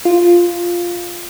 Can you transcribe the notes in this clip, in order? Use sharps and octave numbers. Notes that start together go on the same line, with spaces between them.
F4